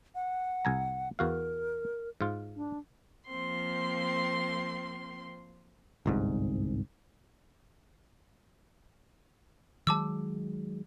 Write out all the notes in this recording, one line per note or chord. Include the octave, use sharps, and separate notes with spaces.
F#5
C2 G#5 A#5
E2 F#4 A#4 F5
G#2 F4
D4
F3 A#3 C4 C6
G1 C2 G#2
D#3 F#3 G#3 A5 D6 E6